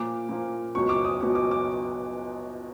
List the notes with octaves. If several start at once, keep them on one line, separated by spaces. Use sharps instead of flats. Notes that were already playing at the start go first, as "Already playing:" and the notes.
Already playing: A#2 F3 A#3 D6
A#2 F3 A#3
C#2 B2 F#3 C#6
D6
D#6
C#2 B2 F#3 D6
D6
D6